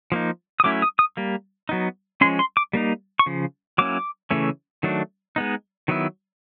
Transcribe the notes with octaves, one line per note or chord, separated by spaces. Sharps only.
F3 A#3 D#4
D#6
F#3 A3 C#4 E4 D6
D#6
D#6
G3 A#3
F#3 B3 D#4
F3 G#3 C#4 C6
C6
D6
G3 A#3 D#4
C#6
C#3 F3
F#3 A#3 C#4 E4 D6
C#3 E3 A3 C#4
D#3 F#3 A3 D4
G#3 B3 D#4
D#3 F#3 B3 E4